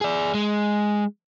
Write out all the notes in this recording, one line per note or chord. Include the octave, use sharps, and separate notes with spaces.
G#4 D5
G#3